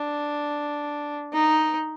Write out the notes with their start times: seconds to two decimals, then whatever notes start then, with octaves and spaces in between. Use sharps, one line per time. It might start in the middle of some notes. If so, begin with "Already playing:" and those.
Already playing: D4
1.33 D#4